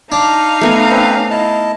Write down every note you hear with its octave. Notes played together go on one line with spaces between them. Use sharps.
D4 D#4 F5 A#5
A3 B3 G#5
C4 C#4 B4
E4 D#5 A5